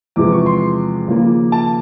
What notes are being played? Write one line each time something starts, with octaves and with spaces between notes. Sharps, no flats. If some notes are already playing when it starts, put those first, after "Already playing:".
E2 C3 F3 G#3 D6
C#6
C6
D#2 C#3 F3 A#3
A5